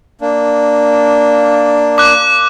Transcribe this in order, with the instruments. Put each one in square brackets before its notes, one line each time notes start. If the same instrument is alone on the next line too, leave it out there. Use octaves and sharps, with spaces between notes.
[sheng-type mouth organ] A#3 D4
[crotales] D6 F#6